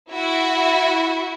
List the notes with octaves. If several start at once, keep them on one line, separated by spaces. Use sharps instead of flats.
E4 F#4 E5